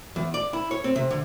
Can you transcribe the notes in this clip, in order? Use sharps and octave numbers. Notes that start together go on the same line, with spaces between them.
E2
D5
E4
C#5
C4
C3
D3